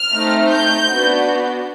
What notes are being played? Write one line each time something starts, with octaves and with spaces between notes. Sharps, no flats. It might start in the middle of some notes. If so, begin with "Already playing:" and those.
Already playing: F6
A3 C4 D#4
G6
B3 D4 F#4